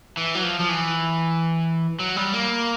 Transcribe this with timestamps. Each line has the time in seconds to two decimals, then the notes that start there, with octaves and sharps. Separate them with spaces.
0.17 E3
0.35 F#3
0.43 F3
0.60 F3
0.69 E3
1.99 F#3
2.16 G3
2.33 A#3